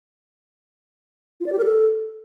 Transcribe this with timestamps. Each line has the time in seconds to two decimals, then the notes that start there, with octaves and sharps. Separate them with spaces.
1.40 F4
1.46 D5
1.52 G4
1.58 A#4
1.64 A4